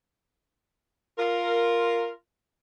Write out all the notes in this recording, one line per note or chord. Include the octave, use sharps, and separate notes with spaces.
F4 A#4